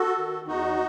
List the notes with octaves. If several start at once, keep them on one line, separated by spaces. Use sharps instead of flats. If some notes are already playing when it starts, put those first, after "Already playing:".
Already playing: F#4 A4
D#3
E2 D#4 F#4